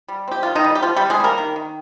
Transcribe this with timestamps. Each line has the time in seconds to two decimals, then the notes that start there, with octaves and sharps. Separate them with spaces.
0.08 G3
0.28 C4 G4
0.43 D#3 F4
0.55 D#3 D#4
0.64 G3
0.75 G4
0.82 F3 C4 F4
0.96 G3 G4
1.01 C4
1.10 G#3 G#4
1.20 G3 A#3 A#4
1.38 D#3
1.56 D#3